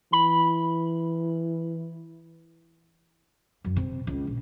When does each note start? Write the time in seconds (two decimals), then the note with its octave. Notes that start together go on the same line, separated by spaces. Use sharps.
0.12 E3 B5
3.64 F#2
3.76 C3
4.07 C#2
4.27 A#1